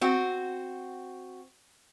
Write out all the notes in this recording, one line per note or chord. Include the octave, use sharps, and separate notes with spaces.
C4 F#4